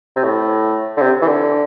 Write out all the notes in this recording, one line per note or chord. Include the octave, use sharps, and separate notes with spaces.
C3
A2
D3
C3
E3
D3